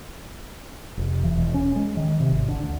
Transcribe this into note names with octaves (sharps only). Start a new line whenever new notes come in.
F1
E3
E1
C#4
G#3
D#3
C3
G#1
D3
D2